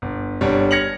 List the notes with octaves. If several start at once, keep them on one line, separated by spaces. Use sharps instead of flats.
G1
G1 G3 D4 C#5
F6 G#6 A#6 C#7 F7 F#7